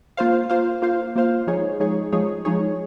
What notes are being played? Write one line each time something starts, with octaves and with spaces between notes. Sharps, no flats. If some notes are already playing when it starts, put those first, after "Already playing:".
A#3 F4 C5 F5
A#3 F4 C5 F5
A#3 F4 C5 F5
A#3 F4 C5 F5
F3 G#3 D#4 G#4 C#5
F3 G#3 D#4 G#4 C#5
F3 G#3 D#4 G#4 C#5
F3 G#3 D#4 G#4 C#5